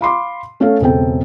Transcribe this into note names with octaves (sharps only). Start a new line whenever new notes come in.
F5 B5 C6 D6
A3 C#4 A4 C#5 F5
E1 C#3 C4 A4 G5